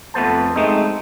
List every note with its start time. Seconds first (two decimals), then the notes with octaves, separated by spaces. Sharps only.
0.14 F2 A3 B3 C5 A5
0.56 G#3 A3 C4 D#4